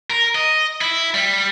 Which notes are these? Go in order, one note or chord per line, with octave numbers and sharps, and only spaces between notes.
A#4
D#5
E4
G3